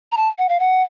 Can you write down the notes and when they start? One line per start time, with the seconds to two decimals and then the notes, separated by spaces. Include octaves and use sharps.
0.12 A#5
0.17 A5
0.38 F#5
0.49 F5
0.60 F#5